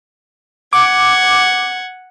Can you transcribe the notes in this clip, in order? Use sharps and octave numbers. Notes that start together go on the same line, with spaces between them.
F#5 D6 G#6